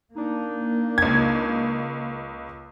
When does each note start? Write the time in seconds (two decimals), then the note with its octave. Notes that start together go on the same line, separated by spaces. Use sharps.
0.16 A#3 D4 D#4
0.98 C#2 G#6